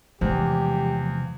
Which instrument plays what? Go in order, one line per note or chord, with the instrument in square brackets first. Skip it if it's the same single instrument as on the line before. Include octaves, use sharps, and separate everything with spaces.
[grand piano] E2 [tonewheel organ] C3 F3 [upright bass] G3 G#3 [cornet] G4